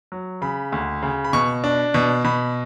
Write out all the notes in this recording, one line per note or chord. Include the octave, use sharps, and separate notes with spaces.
F#3
C#3 B5
D2
C#3
B5
B2 C#6
D4
B2
B2 B5